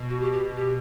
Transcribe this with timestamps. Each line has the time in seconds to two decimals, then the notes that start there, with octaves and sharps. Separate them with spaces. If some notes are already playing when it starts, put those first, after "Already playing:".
Already playing: B2
0.09 F#4
0.20 G4
0.32 G4
0.57 G4